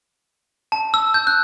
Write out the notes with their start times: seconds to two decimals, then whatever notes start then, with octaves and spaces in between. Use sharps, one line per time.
0.72 A5
0.94 E6
1.14 G6
1.27 F#6